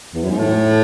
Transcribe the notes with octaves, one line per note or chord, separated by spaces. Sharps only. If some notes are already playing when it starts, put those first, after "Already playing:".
E2
F#2
G#2
A2